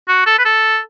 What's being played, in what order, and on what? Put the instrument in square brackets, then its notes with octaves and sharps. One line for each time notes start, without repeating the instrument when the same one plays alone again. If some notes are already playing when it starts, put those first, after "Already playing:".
[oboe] F#4
A4
B4
A4